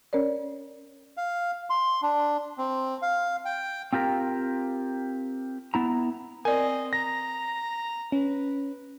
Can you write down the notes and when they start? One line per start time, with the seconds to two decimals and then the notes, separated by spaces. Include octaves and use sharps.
0.13 C#4 A#4 C#5 D5
1.17 F5
1.70 C6
2.02 D4
2.58 C4
3.02 F5
3.45 G5
3.93 C4 F4 G4 A#4
5.74 B3 E4 A#5
6.45 C4 A#4 D5 D#5 G#5
6.93 A#5 A#6
8.12 C#4 B4